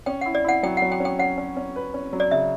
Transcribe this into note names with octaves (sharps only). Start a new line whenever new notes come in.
C#4 G5
F#5
E4
D5
E4 F#5
F#3 G5
F#5
F#3
G5
C#4
G5
C#4 F#5
C#4
C#4
B4
C#4
F#3
D5
C#3 E5